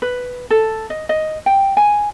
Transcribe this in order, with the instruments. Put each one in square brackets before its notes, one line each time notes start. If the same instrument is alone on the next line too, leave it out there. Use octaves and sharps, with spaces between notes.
[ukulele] B4
A4
D#5
D#5
G5
G#5